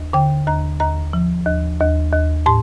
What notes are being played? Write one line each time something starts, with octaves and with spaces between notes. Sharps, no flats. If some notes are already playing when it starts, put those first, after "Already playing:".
Already playing: D#2
D3 G5
D#2 A#5
D#2 A#5
F3
D#2
D#2
D#2
A2 C6